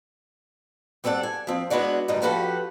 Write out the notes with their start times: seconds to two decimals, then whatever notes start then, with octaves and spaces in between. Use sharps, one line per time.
1.04 G3 C4 A4 D5 F#5
1.23 G#5
1.47 F3 C4
1.70 G#3 B3 D4 E4 F#4 D5
2.08 D2 G2 C#3 G3 D#4
2.22 F3 C#4 F#4 G4 A4 B4